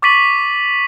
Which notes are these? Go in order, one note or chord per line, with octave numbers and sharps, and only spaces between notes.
C#6 D6 A6 B6 D#7 F#7